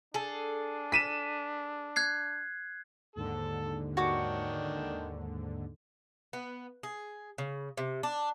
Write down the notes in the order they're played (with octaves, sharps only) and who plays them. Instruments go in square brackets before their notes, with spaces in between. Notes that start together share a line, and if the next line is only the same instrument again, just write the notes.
[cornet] D4 [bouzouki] G#4 A4
[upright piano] B6 D#7 E7
[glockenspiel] F#6 G#6 C7
[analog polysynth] D#2 G#2 D3 [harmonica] A4 A5
[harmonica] D#3 D4 G5 [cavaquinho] F#4 C#5 D6
[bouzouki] B3
G#4
C#3
C3
D4